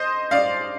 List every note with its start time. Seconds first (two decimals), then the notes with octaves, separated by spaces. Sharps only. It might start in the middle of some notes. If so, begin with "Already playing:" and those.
Already playing: C5 D#5
0.31 D5 F5